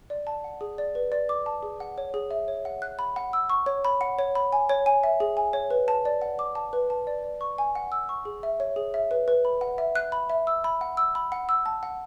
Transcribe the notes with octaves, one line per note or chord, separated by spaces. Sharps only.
D5
A5
F#5
G#4
D5
B4
D5
D6
A5
G#4
F#5
C#5
G#4
E5
C#5
F#5
F#6
B5
F#5
E6
C#6
C#5
B5
F#5
C#5
B5
G#5
C#5
G#5
E5
G#4
G#5
C#5
B4
A5
D5
F#5
D6
A5
B4
A5
D5
D5
C#6
G#5
F#5
E6
C#6
G#4
E5
C#5
G#4
E5
B4
B4
B5
F#5
E5
F#6
B5
E5
E6
B5
F#5
E6
B5
F#5
E6
A5
F#5